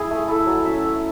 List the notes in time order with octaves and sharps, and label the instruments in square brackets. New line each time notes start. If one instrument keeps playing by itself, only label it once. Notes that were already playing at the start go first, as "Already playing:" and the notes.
Already playing: [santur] E4 G#4
A3
E4 A4
F#3
C#4 E5
A3